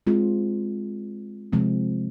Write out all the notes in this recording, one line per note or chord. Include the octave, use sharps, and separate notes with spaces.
G#3 C4 F4
C3 F3 G#3 C4